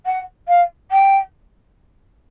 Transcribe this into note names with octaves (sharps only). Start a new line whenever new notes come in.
F#5
F5
G5